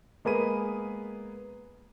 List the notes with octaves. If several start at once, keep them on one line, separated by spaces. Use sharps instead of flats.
G#3 A#3 B3 G#4 B5 D#7